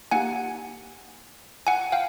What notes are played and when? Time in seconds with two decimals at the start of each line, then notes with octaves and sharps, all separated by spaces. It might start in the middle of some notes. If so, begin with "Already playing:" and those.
0.11 A#3 D#4 G4 F#5 G#5
1.67 F#5 G#5
1.92 F5 G5